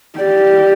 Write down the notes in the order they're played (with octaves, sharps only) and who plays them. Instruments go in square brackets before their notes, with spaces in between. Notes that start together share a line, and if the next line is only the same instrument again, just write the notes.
[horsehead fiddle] G4 [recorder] D5